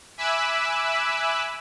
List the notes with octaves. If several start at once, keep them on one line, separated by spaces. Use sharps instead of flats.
E5 G#5 B5 D6 E6 F#6